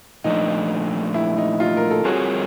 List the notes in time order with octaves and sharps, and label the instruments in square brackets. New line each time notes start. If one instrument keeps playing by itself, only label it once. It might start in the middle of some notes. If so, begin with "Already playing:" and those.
[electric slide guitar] A#2 F3 A3 D4 [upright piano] D#4
[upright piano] E4
D#4
D#4 F4
A#4
A4
[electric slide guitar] G3 C4 F4 A#4 C#5 [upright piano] F#4 G#4